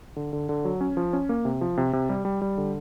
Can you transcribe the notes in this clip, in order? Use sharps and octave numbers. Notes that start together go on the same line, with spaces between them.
D3
D3
D3
F#3
C#4
F3
C#4
A#3
C3
F3
C3
C3
G3
G3
G3
D3